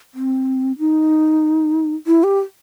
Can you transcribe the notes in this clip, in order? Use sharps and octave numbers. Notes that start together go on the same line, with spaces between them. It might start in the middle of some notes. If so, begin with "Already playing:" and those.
C4
D#4
E4
G4